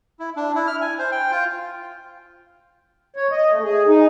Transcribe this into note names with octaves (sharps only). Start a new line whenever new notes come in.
E4
D4
E4
F6
G#5
C5
G5
F4
C#5
D#5
A3
G#4
D#4